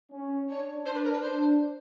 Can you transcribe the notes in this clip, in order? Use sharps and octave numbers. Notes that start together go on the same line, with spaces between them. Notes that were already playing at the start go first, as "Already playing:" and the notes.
C#4
D4 C#5
D4 C5
B4
A#4
B4
D4 C5